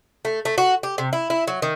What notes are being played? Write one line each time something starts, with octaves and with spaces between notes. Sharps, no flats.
A3
A3
F#4
G4
C3
E4
E4
F#3
D#3